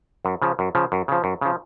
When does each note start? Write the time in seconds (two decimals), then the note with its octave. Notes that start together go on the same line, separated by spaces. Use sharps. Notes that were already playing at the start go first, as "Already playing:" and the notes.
0.25 F#2
0.42 C#3 F3
0.59 F#2
0.75 C#3 F3
0.92 F#2
1.08 C#3 F3
1.24 F#2
1.41 C#3 F3